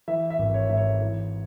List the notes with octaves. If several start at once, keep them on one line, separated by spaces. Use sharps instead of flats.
E3 E5
E5
G#1
C#5
G#2 E5
C#5
E3